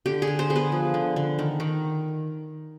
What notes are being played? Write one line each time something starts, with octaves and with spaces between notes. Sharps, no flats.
D3 G4
G#4
D3
C5
B3 G#4
B4
F3
D3
D3
D#3
D#3